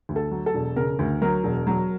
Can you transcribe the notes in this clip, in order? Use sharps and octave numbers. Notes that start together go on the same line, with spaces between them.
D2
A4
F#3
A4
E1
C#3 A#4
D2
F#3 A#4
E1
F#3